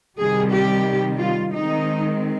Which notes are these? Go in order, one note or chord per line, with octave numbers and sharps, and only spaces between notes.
C3 D#3 G3 G#4
G4
F4
D#3 G#3 C4 D#4